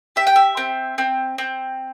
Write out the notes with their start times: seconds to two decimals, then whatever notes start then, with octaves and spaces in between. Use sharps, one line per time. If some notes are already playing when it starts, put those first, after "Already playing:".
0.16 G4 E5
0.27 G5
0.36 E5
0.57 C4
0.98 C4
1.38 C4